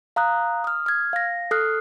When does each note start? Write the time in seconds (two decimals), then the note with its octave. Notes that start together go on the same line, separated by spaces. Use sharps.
0.16 F5 A#5 D#6 F#6
0.64 D#6 F6
0.86 F6 G#6
1.13 F5 A#6
1.51 A4 D#6 F6 F#6 C7